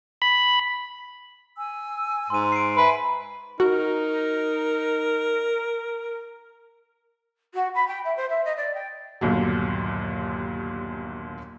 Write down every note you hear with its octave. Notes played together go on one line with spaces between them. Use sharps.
B5
G#5 E6
G#2 C6 D#7
C7 D7
B4 E5 G#5 A#5
D#4 F#4 A#4
F#4
B5
G5
E5
C5
E5
D#5
D5
G5
G1 D#2 A#2 F#3